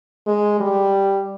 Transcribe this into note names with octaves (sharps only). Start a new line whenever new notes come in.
G#3
G3